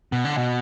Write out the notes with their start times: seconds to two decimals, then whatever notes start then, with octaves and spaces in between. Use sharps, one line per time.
0.12 B2
0.25 D3
0.37 B2